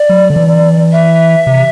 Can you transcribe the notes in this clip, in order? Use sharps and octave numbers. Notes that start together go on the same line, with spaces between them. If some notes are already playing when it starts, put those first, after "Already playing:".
Already playing: D5
F#3
D3
E3
E5
C3